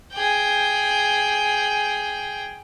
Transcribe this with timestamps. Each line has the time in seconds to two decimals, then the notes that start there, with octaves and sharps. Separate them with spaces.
0.13 G#4 G5